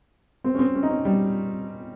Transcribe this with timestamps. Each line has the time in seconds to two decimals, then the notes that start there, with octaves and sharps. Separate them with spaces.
0.44 C4
0.55 C#4
0.59 C4
0.75 C#4
0.83 D#4
0.90 C#4
1.05 G3